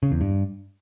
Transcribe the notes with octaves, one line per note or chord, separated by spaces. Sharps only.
C#3
E2
G2